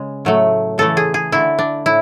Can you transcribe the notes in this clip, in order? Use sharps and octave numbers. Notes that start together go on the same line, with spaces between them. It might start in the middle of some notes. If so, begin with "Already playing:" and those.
Already playing: C#3 G#3
A2 F#3 A3
C#3 E3 A3 A4
G#4
G#4
D3 A3 E4
D4
A2 E4